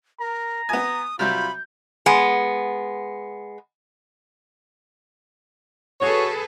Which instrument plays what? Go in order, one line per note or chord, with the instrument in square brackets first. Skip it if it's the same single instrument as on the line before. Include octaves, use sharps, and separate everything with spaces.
[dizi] A#4 [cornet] A#5
[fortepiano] B3 G#5 [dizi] D#6
[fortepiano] C3 F#3 G3 [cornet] F4 [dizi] B5 [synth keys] G6
[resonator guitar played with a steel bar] G#3 B3
[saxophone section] F#4 C#5 [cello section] G#4 A4 B4